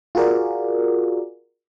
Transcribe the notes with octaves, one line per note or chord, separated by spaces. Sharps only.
F4 F#4 G#4 A#4 D5